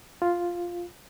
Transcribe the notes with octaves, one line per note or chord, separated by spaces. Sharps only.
F4